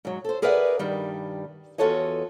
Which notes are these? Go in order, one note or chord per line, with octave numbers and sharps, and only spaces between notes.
G#2 F#3
A4 C5
G#4 A#4 B4 D5 E5 F#5
G2 D#3 G3
E2 F4 F#4 A4 C#5 D#5